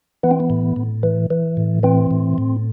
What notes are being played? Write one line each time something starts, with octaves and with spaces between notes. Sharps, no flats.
E3 B3
C4
B3
A2
A2
E3
E3
A2
E3 C4
A2
A2